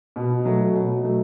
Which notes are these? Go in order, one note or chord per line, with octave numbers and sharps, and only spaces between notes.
B2
F#3 A3
B2
F#3 A3